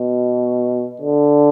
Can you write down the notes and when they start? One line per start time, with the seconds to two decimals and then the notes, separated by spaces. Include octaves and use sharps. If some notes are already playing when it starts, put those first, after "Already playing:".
Already playing: B2
1.01 D3